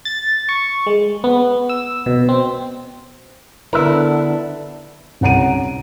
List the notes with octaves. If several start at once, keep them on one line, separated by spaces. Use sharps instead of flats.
A6
C#6
G#3
B3
E6
B2
C4
D3 B3 D4 E4 A#4 B4 E5
C2 C#4 F#5 A#5 D7 D#7